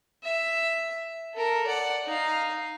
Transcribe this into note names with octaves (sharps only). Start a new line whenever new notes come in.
E5
A4 A#4
D5 F#5
D#4 F5